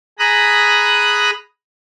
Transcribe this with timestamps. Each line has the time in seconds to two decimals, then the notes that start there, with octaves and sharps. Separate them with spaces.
0.19 G#4 A#5 B5 D#6 F#6